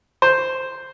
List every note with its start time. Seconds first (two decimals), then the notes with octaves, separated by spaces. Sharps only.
0.22 C5